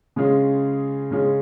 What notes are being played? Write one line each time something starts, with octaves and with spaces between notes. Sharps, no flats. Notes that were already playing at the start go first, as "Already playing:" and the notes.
C#3 G#3 C#4 F4 G#4
C#3 G#3 C#4 F4 G#4